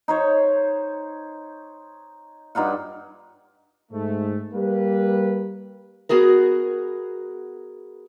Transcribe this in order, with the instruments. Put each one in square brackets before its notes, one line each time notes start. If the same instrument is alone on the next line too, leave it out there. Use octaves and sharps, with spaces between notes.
[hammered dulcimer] D#4 C5 C#5
G2 D#4 F4 F#5
[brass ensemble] G#2 A3
G3 A#3 B4
[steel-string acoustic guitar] B3 F#4 G#4 A#4